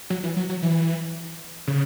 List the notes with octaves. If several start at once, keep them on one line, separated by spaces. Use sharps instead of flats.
F#3
E3
F#3
F#3
E3
C#3